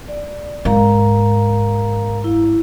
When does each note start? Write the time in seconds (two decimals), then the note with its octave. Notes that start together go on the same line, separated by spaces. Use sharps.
0.08 D5
0.65 G#2 A#4 F5 A#5
2.24 E4